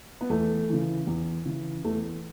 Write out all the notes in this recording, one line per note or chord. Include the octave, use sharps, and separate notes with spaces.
B3
E2 A3
C#3 E3
E2
C#3 E3
E2 A3